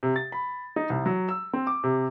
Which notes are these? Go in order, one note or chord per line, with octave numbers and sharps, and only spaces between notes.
C3
A6
B5
D#4
C2
F#3
E6
C4
D6
C3